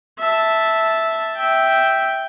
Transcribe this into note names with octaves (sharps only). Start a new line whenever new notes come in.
E5 A5
E5 G5